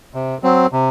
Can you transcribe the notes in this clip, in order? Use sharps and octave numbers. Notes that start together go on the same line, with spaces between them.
C3
F#3 C4
C3